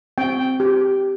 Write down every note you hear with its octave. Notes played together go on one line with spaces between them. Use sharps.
C4 G5
G4